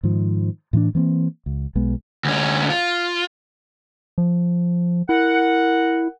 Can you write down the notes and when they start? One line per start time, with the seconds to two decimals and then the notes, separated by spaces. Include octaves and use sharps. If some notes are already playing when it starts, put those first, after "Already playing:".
0.03 G#2 D#3 F3
0.73 A2 E3 C4 D4
0.95 E3 A#3 C4
1.46 C#2
1.75 B1 G#3 B3
2.25 D2 C#4
2.70 F4
4.18 F3
5.09 E4 A#4 F#5